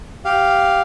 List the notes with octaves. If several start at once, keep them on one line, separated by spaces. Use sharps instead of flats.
G4 F5